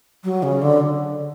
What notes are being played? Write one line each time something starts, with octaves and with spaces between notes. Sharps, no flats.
F#3
C#3
D3